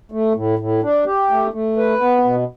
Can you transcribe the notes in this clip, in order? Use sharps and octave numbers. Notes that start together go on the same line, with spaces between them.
A3
A2
A2
D4
G4
A3
A3
B4
B3
B2